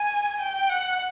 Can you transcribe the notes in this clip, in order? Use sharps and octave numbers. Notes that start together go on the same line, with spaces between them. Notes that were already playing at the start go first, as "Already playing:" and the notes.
Already playing: G#5
G5
F#5